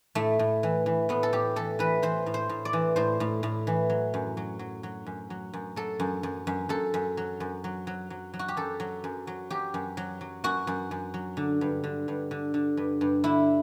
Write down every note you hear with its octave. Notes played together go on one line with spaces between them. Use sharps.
A2 A3
A2
E3
E3
A2 B3
A4
A2 G4
E3 A4
E3 B4
E3 C5
A2
C5
A2
D5
E3
A2 C5
A2
A2
E3
F#3
F#2
F#3
F#3
F#3
F#2
F#3
F#2
F#3 A4
F#2
F#2
F#2
F#2 A4
F#2
F#3
F#2
F#3
F#3
F#3
F#3
F#4
G4
F#2 A4
F#3
F#2
F#3
F#3 G4
F#2
F#3
F#3
F#2 F#4
F#2
F#2
F#3
D3
G2
D3
G2
D3
D3
G2
G2
D3 E4